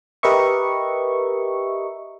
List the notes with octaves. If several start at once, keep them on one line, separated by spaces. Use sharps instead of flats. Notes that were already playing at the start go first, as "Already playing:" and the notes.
G4 A#4 B4 D#5 E5 C#6